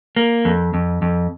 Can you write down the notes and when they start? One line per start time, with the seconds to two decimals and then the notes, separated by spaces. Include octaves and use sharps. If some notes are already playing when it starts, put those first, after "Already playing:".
0.16 A#3
0.45 F2
0.74 F2
1.02 F2